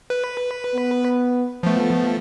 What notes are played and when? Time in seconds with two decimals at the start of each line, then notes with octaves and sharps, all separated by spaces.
0.10 B4
0.75 B3
1.63 F3 A3 B3